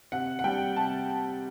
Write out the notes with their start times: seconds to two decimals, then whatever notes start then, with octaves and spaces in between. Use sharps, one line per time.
0.12 C3 F#5
0.39 F#5
0.44 G3 D4 G5
0.76 C3 A5